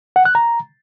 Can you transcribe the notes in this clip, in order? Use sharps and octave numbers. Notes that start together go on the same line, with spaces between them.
F#5
F#6
A#5